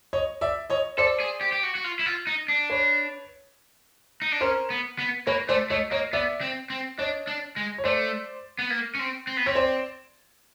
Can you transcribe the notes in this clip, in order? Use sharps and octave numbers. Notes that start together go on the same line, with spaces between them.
C#5 D#5
D5 E5
C#5 D#5
A4 C5 D5
G#4
G4
G4
F#4
F#4
F4
E4
F4
D#4
D4
B4 C#5
D#4
D4
C#4 A#4 C5
B3
B3
A#3 B4 C#5
A3 C5 D5
A3 C#5 D#5
A#3 C#5 D#5
B3 D5 E5
C4
C4
D4 C#5 D#5
D4
G#3
C#5
A3 C5 D5
B3
A#3
C#4
C4
C4
B3
C4 C#5
C5 D5